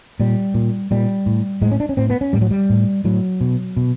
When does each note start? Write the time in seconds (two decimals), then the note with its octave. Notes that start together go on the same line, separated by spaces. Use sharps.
0.20 A#2 G3
0.54 A#2
0.91 A#2 G3
1.26 A2
1.62 A2 G#3
1.71 C#4
1.80 D4
1.89 C#4
1.97 A2 C4
2.10 B3
2.21 C#4
2.33 A2 G3
2.42 F#3
2.51 G3
2.70 A2
3.05 A2 F#3
3.41 B2
3.77 B2